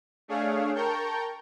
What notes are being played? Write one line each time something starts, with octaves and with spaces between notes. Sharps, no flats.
A3 D4 G#4 C#5 F5
A#4 G5 A5 C#6 G6